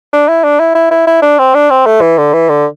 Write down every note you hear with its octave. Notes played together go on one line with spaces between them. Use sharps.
D4
E4
D4
E4
E4
E4
E4
D4
C4
D4
C4
A3
E3
D3
E3
D3